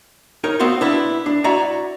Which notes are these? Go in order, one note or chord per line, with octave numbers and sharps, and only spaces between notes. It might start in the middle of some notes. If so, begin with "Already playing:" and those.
D#4 A#4 C#5
B3 C4 F#4 F5 C6
D4 E4 B4
D4
E4 F#4 D5 E5 A#5